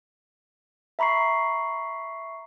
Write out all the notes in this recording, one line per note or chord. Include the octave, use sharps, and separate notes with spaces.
E5 A#5 B5 C#6 C7